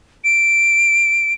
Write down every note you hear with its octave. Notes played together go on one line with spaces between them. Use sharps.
D7